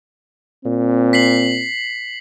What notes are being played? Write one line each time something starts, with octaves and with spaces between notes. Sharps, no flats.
A#2 C4
B6 C7 F#7